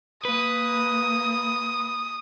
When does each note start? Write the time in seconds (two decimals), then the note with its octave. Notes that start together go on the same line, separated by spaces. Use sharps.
0.25 A#3 B4 D#6